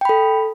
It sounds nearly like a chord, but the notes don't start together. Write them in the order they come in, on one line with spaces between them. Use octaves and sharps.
G5 B5 A4